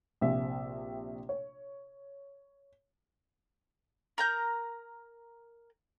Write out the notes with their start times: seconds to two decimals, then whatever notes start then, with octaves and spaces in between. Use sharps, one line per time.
0.21 A#1 C3 E5
1.29 C#5
4.18 A#4 A#5 G6